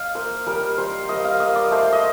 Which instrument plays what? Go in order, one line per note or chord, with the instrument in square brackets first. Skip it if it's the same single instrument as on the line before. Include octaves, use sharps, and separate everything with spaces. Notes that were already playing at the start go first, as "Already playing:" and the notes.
Already playing: [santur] D#5 F5
A#3 C5
G3 A#4
G3 C5
A#3 D#5
F5
A#3 D#5
D5
A3 C5
D#5